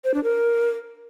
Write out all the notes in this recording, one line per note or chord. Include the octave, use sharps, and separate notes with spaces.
C5
D4
A#4